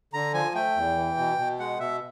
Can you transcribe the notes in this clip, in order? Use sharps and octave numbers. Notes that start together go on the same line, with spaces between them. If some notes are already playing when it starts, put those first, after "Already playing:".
D3 A#5
F3 G#5
A3 G5
E2
E3
B2
B2
G#3 F#5
B2 E5